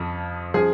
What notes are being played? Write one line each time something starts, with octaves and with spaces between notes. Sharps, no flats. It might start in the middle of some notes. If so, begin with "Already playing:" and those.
Already playing: F2 F3
F3 G#4